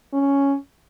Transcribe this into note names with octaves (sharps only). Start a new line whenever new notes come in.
C#4